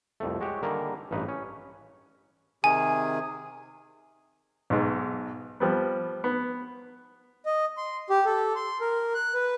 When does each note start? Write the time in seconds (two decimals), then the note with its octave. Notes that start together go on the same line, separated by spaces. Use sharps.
0.20 C2 F2 A3
0.41 G#3 F#4 G4 C#5
0.63 D3 D#3 G3 A#3 G#4 A#4
1.11 A1 G2 D#4 B4
1.28 C#4
2.64 C3 D#3 G#4 G#5
4.70 B1 G#2
5.60 F3 G3 B3
6.24 B3
7.46 D#5
7.77 C6
8.10 G4
8.25 A4
8.55 C6
8.81 A#4
9.14 F#6
9.34 B4